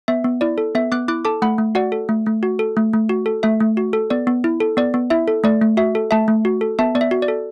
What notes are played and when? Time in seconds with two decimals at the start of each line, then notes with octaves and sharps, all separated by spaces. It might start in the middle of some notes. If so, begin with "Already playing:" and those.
0.08 B3 E5
0.24 B3
0.41 E4 D5
0.58 A4
0.75 B3 E5
0.92 B3 D6 F#6
1.08 E4 D6 F#6
1.25 A4 A5 D6
1.42 A3 F#5 B5
1.58 A3
1.75 F#4 D5 F#5
1.92 A4
2.09 A3
2.26 A3
2.43 F#4
2.59 A4
2.77 A3
2.93 A3
3.09 F#4
3.26 A4
3.43 A3 E5
3.60 A3
3.77 F#4
3.93 A4
4.10 B3 D5
4.27 B3
4.44 E4
4.60 A4
4.77 B3 D5
4.94 B3
5.10 E4 E5
5.28 A4
5.44 A3 D5
5.62 A3
5.77 F#4 E5
5.95 A4
6.11 A3 E5 A5
6.28 A3
6.45 F#4
6.61 A4
6.79 B3 E5 A5
6.95 B3 D5
7.01 E5
7.11 F#4
7.22 D5
7.28 A4